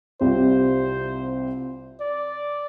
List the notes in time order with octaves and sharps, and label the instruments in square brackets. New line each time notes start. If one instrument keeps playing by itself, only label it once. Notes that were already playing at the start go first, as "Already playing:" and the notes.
[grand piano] C2 C3 G3 C4 F4 [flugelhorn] C5
[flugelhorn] D5